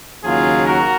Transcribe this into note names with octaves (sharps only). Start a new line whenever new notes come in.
D#2 C#3 F#3 F4 G#4
F#4 A#4